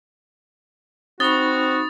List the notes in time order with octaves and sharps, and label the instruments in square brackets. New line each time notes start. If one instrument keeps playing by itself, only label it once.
[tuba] C4 [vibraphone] D#4 B5 C#6 [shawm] F#4 [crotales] D#6 A6